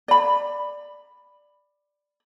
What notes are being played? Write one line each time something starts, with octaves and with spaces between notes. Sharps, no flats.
D5 B5